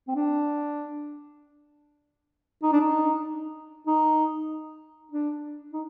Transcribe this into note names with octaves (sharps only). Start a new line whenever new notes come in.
C4
D4
D#4
D4
D#4
D#4
D4
D#4